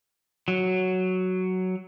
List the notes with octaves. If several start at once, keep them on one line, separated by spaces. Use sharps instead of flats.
F#3